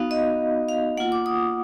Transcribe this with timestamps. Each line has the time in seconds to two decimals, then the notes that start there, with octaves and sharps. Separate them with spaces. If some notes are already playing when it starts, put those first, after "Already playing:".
Already playing: B3 D#4 F#4 F5
0.11 D#5
0.69 F5
0.97 A#3 F4 F#5
1.12 D6
1.26 D#6